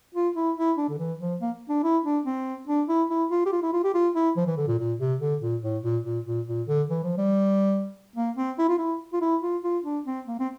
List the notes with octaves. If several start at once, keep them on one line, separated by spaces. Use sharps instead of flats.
F4
E4
E4
D4
D3
E3
F3
A#3
D4
E4
D4
C4
D4
E4
E4
F4
G4
F4
E4
F4
G4
F4
E4
F3
E3
D3
A#2
A#2
C3
D3
A#2
A2
A#2
A#2
A#2
A#2
D3
E3
F3
G3
A#3
C4
E4
F4
E4
F4
E4
F4
F4
D4
C4
A#3
C4